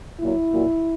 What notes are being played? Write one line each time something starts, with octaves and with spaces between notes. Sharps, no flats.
A#2 F#3 E4
A#2 F#3